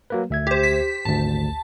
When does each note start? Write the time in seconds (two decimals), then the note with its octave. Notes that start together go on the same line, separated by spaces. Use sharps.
0.10 F#3 A#3 B4
0.30 D2 E5 G#6
0.47 G4 C5
0.63 B6
1.05 G#1 D2 A5